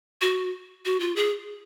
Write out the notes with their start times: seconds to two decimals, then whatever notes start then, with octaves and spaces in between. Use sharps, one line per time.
0.21 F#4
0.85 F#4
1.00 F4
1.16 G#4